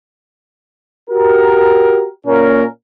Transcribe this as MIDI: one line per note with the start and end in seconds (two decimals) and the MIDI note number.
1.10 2.07 66
1.10 2.07 67
1.10 2.07 70
2.27 2.63 46
2.27 2.63 58
2.27 2.63 61
2.27 2.63 70